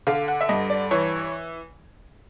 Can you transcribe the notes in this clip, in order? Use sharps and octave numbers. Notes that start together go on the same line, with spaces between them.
D3 F5
F#5
E5
G2 D#5
D5
E3 C#5